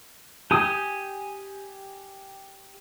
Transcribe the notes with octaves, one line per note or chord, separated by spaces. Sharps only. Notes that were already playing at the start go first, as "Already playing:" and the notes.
G4 G#5 D#6